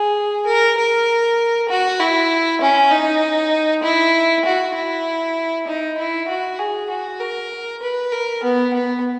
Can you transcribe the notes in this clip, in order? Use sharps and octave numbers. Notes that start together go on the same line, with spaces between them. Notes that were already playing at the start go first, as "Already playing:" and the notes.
Already playing: G#4
A#4
A#4
F#4
E4
C#4
D#4
E4
F#4
E4
D#4
E4
F#4
G#4
F#4
A#4
B4
A#4
B3
B3